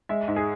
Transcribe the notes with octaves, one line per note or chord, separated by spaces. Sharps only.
G#3 E5
G#2
G#4